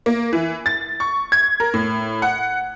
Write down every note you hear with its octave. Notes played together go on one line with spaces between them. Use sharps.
A#3
E3
A6
C#6
G#6
A#4
A2
F#5